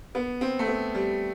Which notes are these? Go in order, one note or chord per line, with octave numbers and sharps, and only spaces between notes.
B3
C4
A3
B3
G3